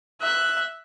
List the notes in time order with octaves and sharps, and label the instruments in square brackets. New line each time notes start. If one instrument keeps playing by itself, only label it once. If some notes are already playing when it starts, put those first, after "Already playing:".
[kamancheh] E5 F#6